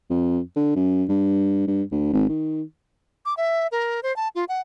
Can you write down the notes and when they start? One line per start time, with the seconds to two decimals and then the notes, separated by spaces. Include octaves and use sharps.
0.10 F2
0.56 D3
0.76 F#2
1.09 G2
1.67 G2
1.91 D2
2.13 G#1
2.29 D#3
3.25 D6
3.37 E5
3.72 A#4
4.03 C5
4.16 A5
4.35 F4
4.49 F#5